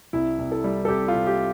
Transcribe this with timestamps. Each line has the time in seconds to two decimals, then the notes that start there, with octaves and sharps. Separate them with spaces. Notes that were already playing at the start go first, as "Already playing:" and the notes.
0.13 C2 E4
0.39 C2
0.52 A4
0.64 G3
0.85 A4
0.88 C2 G4
1.08 F4
1.14 C3
1.27 G4